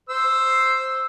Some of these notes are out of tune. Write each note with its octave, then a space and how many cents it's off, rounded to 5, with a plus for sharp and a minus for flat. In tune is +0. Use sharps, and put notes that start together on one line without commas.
C5 +0 E6 +0